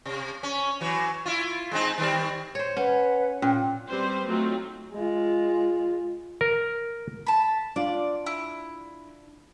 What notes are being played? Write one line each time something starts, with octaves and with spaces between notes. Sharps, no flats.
C3
C#4
E3 F#3
E4 F4
G#3 C4 D#4
D#3 G3 C4
C5 C#5
C#4 B4 C#5 F#5
A#2 C#4 G5
G3 C4 B4 C5
F#3 A3 C4 D#4 F4
G#3 F4
A#4
A5 B5
D4 F4 D5
E4